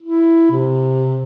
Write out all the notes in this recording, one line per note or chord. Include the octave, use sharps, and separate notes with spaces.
E4
C3